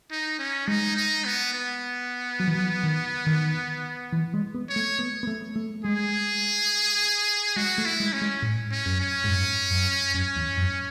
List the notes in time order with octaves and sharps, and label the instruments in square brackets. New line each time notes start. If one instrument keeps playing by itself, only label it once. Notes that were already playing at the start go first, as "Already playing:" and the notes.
[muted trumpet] D#4
C#4
[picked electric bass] G#3 [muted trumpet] D#4
[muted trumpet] D#4
B3
B3
[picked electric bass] F#3
E3
F#3
D#3
D#3
E3
G#3
B3
[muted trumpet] C#5
[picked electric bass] A3
B3
B3
A3
A3
[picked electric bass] G#3 [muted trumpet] G#4
[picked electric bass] G#3 [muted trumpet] F#4
[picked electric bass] A3
[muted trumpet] E4
[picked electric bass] G#3
[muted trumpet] C#4
[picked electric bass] G#3
A2
[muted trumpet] C#4
[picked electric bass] F#2
[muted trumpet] C#4
[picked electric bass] G#2
F#2
F#2
[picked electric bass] F#2 [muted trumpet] C#4
[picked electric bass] E2
F#2